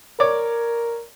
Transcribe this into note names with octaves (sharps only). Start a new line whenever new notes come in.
A#4 C#5 D5 D6